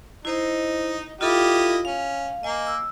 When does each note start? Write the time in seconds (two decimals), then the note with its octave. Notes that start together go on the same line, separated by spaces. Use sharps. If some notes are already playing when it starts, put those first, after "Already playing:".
0.25 D#4 E4 C5 D#5
1.21 E4 F4 G4 A4 D#5 F5
1.85 C#4 F5
2.43 A#3 D#5 G#5
2.67 E6